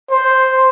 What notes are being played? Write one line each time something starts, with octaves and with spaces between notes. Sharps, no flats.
C5